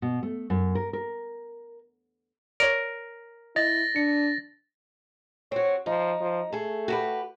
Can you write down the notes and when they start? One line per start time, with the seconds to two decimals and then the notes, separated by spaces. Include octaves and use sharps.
0.02 B2
0.23 A3
0.50 F#2
0.75 A#4
0.93 A#4
2.60 A#4 C#5 D5
3.56 E4 D#5 A6 A#6
3.96 D4 C#7
5.52 C4 F#4 C#5
5.86 F3 D#4
6.20 F3
6.52 A3 G#4 A4
6.88 F#4 G4 B4